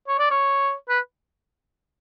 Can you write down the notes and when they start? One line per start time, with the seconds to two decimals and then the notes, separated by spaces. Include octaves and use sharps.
0.08 C#5
0.19 D5
0.30 C#5
0.89 B4